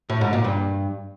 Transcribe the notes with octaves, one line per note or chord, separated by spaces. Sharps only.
A2
G#2
A#2
G2